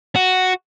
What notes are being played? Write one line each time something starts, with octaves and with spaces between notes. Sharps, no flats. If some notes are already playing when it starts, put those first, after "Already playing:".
F#4